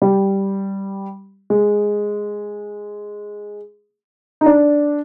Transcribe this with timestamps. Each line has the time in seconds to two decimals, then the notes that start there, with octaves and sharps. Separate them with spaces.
0.02 G3
1.50 G#3
4.41 D#4
4.46 D4